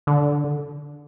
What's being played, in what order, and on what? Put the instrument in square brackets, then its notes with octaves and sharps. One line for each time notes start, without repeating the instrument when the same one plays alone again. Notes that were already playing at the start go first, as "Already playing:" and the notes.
[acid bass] D3